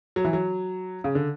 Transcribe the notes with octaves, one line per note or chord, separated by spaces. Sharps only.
F#3
E3
F#3
C#3
D3